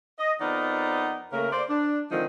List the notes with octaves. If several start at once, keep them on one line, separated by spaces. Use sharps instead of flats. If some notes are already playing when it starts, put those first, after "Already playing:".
D#5
F2 B3 D#4 A#4 D5 F#5
C#3 A3 A#3 A#4
C5 D5
D4
D3 D#3 F3 G#3 C4 D#4